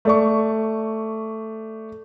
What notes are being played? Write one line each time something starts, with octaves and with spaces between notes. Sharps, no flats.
A3 D5 C#6